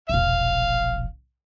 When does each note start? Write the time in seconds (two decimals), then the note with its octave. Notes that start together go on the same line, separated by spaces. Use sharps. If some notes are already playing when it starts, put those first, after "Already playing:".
0.09 E1 A#1 F5